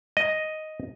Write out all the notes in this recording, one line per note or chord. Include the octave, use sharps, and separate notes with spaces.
D#5